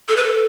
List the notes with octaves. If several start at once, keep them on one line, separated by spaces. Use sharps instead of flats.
A4
B4
A4